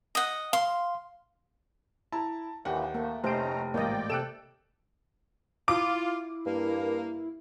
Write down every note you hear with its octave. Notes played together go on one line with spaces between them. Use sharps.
D#5 F#5
F5 C6
E4 A5 A#5
D#2 A#2 E3 F#5 G5
A3 A#3
F1 A3 C#4 D#4 C5 A#5 D7
A1 G#2 A#3 D5 D#5 G5
C3 A4 F#6 D7 E7
E4 F4 D6
G2 A#3